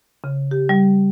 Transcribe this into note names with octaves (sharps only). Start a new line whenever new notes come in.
C#3
G4
G3